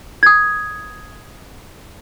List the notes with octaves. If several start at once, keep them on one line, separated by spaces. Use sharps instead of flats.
D#6 G#6